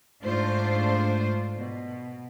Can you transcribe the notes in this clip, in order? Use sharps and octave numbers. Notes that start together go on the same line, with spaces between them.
G#2 A3 D4 F4 C5
B2